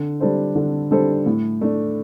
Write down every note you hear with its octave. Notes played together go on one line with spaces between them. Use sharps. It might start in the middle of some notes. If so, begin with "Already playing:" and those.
Already playing: D3
G3 D4 A4 C5
D3
G3 D4 A4 C5
A2
A3 D4